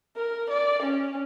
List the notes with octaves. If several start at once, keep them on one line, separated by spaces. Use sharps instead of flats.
A#4
D5
C#4